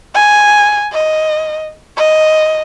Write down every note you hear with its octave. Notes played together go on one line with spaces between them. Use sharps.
G#5
D#5
D#5